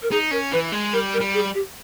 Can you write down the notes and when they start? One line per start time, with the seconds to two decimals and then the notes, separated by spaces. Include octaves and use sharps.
0.02 A#4
0.11 D#4 G#4
0.31 C#4 A#4
0.52 E3 B4
0.72 G#3
0.93 G3 A#4
1.14 A#4
1.20 G3
1.34 G#4
1.54 G4